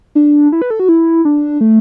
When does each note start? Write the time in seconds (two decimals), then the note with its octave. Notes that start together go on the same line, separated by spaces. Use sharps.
0.15 D4
0.52 E4
0.62 B4
0.70 A4
0.80 F#4
0.89 E4
1.25 D4
1.61 A3